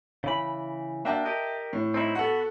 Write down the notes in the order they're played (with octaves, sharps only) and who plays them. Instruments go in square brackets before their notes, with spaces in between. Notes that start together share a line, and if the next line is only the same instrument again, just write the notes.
[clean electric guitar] C#3 E3 B5
[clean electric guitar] A#3 D4 F#4 [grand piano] E5 G5 A5
[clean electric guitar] G4 A#4 D#5
[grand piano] A2
[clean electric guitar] C4 D#4 E4
[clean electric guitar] B3 F#4 [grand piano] A4 F#5